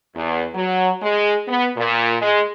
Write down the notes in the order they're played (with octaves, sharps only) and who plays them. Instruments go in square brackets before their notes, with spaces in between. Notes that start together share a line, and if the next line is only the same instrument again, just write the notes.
[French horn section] E2
F#3
G#3
B3
A#2
G#3